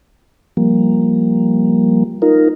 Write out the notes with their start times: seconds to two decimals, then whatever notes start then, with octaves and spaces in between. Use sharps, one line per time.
0.57 F3 G3 A#3
2.22 D#4 F4 A#4